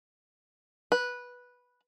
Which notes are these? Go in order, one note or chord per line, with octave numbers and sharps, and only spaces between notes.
B4